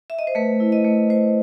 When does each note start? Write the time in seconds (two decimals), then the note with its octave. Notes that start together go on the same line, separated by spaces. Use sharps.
0.10 E5
0.19 D#5
0.27 C5
0.35 A3 B4
0.60 E4
0.72 D#5
0.85 A3
1.10 A3 C5